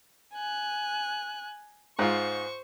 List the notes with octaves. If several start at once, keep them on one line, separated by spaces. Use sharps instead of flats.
G#5 F#6
G#2 F4 C5 C#6